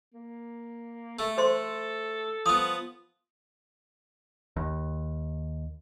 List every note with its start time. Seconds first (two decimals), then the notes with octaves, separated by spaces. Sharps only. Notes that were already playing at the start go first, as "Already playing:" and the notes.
0.14 A#3
1.19 A3 A4
1.38 A4 C5 C6
2.46 F3 B3 D#6
4.56 D#2